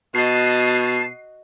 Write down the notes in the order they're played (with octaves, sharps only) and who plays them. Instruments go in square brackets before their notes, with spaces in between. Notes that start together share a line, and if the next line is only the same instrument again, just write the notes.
[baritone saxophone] B2 [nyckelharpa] F#4 D#5 [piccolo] A5 [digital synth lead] C7